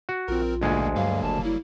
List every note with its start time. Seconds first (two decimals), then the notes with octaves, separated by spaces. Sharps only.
0.09 F#4
0.28 A#1 C4 F4 A#4
0.61 D2 G#2 B2 G#3 A#3 G#5
0.96 G2 F#3 G3 A#3 F5
1.23 F#1 A5
1.44 E4